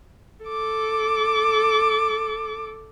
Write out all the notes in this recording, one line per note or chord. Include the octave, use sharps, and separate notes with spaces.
A4 D6